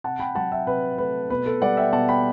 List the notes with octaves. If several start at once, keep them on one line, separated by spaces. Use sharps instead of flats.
C3 F#5 A5
G5 B5
F#3 F#5 A5
E5 G5
C3 B4
A3 B4
B2 B4
A4
G3 D5 F#5
E5 G5
B2 F#5 A5
G5 B5